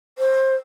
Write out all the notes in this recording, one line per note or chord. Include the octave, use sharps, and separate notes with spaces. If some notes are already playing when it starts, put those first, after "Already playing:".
C5